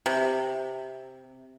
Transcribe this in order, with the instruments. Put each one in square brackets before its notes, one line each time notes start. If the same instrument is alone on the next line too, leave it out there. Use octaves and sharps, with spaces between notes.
[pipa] C3